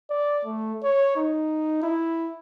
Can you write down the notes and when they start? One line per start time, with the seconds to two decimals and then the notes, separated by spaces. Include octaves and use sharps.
0.10 D5
0.45 A3
0.84 C#5
1.17 D#4
1.83 E4